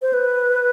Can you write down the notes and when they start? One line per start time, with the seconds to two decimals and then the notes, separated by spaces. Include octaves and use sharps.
0.02 C5
0.13 B4